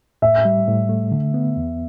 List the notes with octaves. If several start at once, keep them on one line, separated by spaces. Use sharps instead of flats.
A2 E5
G3
A2
A3
D3
B3
E2